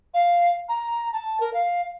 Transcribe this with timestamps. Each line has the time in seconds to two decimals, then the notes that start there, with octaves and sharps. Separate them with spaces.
0.14 F5
0.69 A#5
1.13 A5
1.40 A#4
1.54 F5